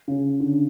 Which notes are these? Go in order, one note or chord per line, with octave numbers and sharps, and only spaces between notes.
C#3
D3